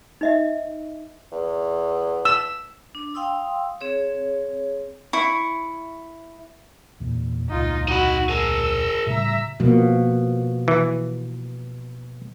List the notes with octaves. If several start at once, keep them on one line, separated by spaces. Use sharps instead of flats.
D#4 D#5 E5
E2
E6
D4
F5 G5 C6 D#6 E6
C4 G#4 C#5
E4 C#6
E2 A#2
E1 C#2 A#2 D#4 F4
D#4 F#4 B5
G#4 A#4 E6
A2 C#3 G3 E5 A#5
B2 F3 A#3
E3